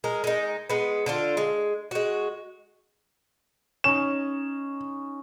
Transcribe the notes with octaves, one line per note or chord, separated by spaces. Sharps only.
G#3 A#4
G#3 D#4
G#3 B3
D3 D4 F4
G#3
G#3 F#4
C#4 D#4 E7